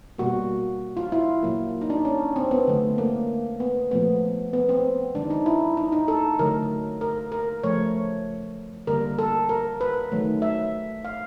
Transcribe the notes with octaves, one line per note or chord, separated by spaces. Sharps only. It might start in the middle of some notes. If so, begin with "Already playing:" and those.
B2 G3 A#3 F#4
F4
E4
A#2 F#3 A#3
D#4
D4
C#4
C4
B3
D3 F#3 A3
A#3
B3
A#2 F3 A3 B3
B3
C4
D#3 G#3 D4
D#4
E4
D#4
D#4
A4
D3 F#3 A3 A#4
A#4
A#4
C#3 F3 A3 C#5
D3 G3 A#3 A#4
A4
A#4
B4
D#3 F#3 A3
E5
F5